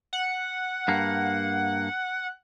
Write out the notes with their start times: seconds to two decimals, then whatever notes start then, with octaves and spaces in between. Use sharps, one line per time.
0.13 F#5
0.88 G2 A#3